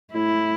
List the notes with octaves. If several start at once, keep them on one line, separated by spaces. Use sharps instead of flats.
A2 E4